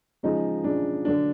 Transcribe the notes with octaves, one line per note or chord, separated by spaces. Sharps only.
C#3 F3 G#3 D#4
C#3 F3 G#3 D4
D3 F#3 D4